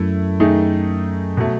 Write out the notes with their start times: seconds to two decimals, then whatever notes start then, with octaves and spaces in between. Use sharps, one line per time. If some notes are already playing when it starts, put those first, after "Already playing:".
Already playing: F#2 A3 E4
0.40 D#3 A3 D#4 G#4
1.37 B2 F#3 A3